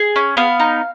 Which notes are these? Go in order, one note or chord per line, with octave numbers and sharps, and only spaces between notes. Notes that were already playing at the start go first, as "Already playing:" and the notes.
Already playing: G#4
C#4
B3 F5
D#4